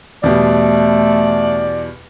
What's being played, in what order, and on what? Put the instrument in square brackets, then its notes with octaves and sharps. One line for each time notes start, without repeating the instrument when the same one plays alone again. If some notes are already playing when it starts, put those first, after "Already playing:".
[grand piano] E2 B2 G3 [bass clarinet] A3 [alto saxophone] D5